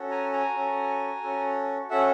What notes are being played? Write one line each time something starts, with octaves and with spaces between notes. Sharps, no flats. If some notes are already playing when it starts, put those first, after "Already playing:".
Already playing: C#4 F#4 A4
G#5 A#5
G#5 A#5
C#4 F#4 A4
C#4 F#4 A4
C#4 F#4 A4 E5 F#5